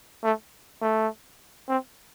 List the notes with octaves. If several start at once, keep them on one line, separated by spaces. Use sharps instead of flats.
A3
A3
C4